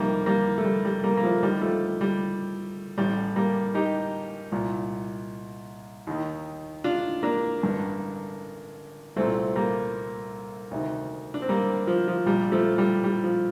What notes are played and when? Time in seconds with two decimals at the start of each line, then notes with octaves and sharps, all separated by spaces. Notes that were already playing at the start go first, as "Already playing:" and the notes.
Already playing: F2 C3 D#3 G3 A#3
0.26 G3 A#3
0.58 A3
0.65 G3
0.85 G3
1.04 G3 A#3
1.17 A#3
1.23 F3 A3
1.42 D#2 D3 G3
1.61 F3 A3
2.01 G3
2.98 A1 A2 G3
3.36 G3 A#3
3.75 D#4 G4
4.52 C2 A#2
6.07 D#2 D#3
6.84 D4 F4
7.23 A#3 D4
7.61 A1 G2 D3
9.16 C2 A#2 A3 C4
9.55 G3 A#3
10.71 D2 C3 D#3
11.34 D4
11.42 C4
11.49 G3 A#3
11.87 F3
12.08 F3
12.26 A#1 A#2 G3
12.52 F3 A3
12.78 G3
13.04 G3
13.24 F3